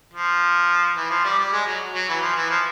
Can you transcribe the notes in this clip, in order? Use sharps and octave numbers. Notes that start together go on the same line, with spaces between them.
F3
E3
F3
G3
G3
G#3
F#3
F#3
E3
F3
E3
F3